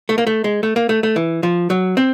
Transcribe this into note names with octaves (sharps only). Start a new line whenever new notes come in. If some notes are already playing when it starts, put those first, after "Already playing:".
A3
A#3
A3
G#3
A3
A#3
A3
A3
E3
F3
F#3
C4